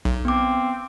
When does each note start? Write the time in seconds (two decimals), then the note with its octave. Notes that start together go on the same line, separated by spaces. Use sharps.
0.05 B1
0.25 B3 C4 D6